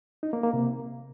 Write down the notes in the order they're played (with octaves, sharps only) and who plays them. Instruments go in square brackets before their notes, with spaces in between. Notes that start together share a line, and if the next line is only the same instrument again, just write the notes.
[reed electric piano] D#4
A#3
A#3
C3